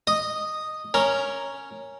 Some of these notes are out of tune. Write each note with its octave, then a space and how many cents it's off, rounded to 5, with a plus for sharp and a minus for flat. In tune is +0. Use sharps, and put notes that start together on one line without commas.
D#5 -5 D#6 -5
C#4 +0 A#4 +0